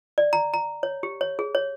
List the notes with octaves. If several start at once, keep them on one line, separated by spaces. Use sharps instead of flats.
D5
A#5
A#5
C#5
G4
C#5
G#4
C#5